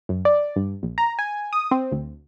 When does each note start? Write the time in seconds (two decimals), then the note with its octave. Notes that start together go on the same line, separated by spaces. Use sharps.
0.09 F#2
0.25 D5
0.56 G2
0.83 A#1
0.98 A#5
1.19 G#5
1.53 D#6
1.71 C4
1.92 D2